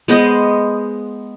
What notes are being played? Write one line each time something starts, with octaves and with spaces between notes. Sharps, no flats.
G#3 B3 C5 D#5